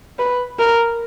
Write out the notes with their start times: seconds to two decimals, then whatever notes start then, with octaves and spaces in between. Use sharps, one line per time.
0.19 B4
0.59 A#4